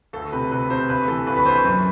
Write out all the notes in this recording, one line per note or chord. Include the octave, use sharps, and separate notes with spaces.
D2 A4
C3 B4
C3 B4
C3 C5
D2 B4
E3 A4
D2 B4
B4
D2 C5
B4
F#2